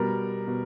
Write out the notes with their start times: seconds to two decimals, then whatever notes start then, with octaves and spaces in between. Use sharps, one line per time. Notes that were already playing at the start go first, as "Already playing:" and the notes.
Already playing: B2 G3 A#4
0.47 B2